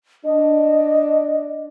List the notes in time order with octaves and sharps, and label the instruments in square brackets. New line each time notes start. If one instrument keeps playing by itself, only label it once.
[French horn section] D4 [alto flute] D#5